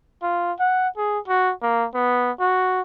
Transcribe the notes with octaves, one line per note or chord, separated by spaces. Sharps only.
F4
F#5
G#4
F#4
A#3
B3
F#4